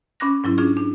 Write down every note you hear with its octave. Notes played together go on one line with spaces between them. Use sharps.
C#4 B5 D6 F#6 A#6
G#2 F#3 C#4 E4
C#4 D4 F4 G#4
D4